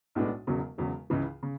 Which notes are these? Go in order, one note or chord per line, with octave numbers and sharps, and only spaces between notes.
B1 A2 G#3 B3 D4
E1 E2 C#3 F#3
E1 E2 C#3 F#3
C#2 C#3 E3
C#3